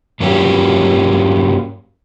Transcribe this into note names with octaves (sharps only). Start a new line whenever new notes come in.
G2 F#3 A#3 C#4 F4 G4